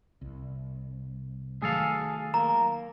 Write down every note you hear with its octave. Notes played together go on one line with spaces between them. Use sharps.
C2
D#3 F#3 A3 G#4 A4 F5
A#3 A#5